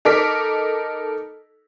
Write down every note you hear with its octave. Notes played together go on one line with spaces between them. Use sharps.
D#4 A4 A#4 D6 B6